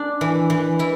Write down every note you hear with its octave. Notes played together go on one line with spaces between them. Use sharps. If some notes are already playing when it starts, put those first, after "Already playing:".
Already playing: D4
E3
E3
E3 E4